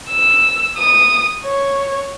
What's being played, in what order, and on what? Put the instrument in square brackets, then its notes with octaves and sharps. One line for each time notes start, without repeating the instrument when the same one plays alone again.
[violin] E6
D#6
C#5